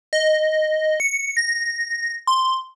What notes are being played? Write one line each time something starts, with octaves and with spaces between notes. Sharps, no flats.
D#5
C#7
A#6
C6